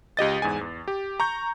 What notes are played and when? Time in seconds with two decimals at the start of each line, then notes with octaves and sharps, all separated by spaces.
0.17 C#2 G4 D#5 A6
0.42 E2 G#2 G#4 G#5
0.61 E2
0.88 G4
1.20 A#5 C#6 G6